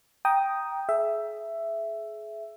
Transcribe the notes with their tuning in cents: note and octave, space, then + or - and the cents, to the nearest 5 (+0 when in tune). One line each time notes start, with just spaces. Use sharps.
G5 +0 A#5 +10 D#6 +0
G#4 +35 E5 +10